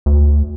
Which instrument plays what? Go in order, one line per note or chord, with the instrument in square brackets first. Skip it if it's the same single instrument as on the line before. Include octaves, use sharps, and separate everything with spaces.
[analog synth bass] D2